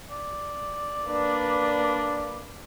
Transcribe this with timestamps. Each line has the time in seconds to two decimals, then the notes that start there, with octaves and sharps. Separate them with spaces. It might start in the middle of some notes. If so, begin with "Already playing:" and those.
0.10 D5
1.09 A#3 D4 B4